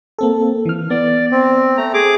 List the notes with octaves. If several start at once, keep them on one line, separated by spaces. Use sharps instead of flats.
A#3 C4 A4
E3 F6
B3 D5
C4
A3 A#5
G#4 D6